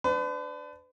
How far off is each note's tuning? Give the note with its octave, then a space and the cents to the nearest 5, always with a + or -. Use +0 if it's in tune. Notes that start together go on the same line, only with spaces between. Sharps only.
D4 +0 B4 +40